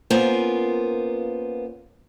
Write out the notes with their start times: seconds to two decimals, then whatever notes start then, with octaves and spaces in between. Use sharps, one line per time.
0.11 A#3 B3 C#4 F4 A#4 C5